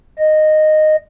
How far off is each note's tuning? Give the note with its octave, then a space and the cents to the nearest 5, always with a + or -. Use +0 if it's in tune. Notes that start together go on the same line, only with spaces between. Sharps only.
D#5 -10